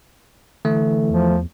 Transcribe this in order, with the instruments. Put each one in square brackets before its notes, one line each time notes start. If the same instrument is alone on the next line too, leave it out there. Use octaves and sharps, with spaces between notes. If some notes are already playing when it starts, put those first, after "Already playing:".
[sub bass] D3 [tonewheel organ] E3 [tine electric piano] A3
[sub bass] E2 [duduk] F3